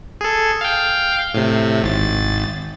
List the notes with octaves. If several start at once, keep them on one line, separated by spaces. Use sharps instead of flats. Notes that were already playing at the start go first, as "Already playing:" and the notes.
G#4 A4
F5 G5
A2 C3
G#1 A6